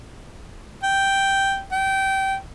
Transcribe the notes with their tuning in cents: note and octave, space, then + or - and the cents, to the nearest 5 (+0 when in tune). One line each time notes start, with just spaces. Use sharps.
G5 -5
G5 -20